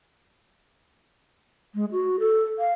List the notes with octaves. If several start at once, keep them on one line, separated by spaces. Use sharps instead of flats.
G#3
F#4
A4
F5